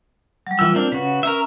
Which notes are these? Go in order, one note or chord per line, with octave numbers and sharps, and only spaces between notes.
F#3 G3
E3 F4 E6
A#3 C4 D4
C#3 F#4 B4
C#4 A#4 E5 A#5 E6